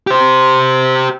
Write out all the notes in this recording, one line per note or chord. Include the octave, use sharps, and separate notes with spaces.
G4 C5